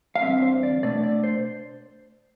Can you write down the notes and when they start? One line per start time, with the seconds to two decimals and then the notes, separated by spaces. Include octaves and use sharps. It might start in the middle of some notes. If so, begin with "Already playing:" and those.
0.15 F5
0.22 E2 D3 G3 C4 E5
0.42 C5
0.63 D5
0.83 B2 A3 D4 D5
1.03 D5
1.24 C5